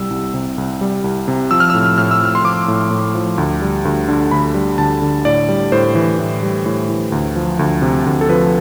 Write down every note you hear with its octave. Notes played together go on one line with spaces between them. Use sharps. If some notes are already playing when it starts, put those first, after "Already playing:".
Already playing: C2 G3 E6
C2
C3
C2
G3
C2
C3
F3 E6
F6
A2 E6
A2 F6
E6
F3 F6
C6
F3 D6
A2
A2
F3
D2
G3
D2
D3
D2 B5
G3
D2 A5
D3
A2 D5
G3
A2 C5
E3
A2
G3
A2
E3
D2
F3
D2
C3
D2
A4
F3 B4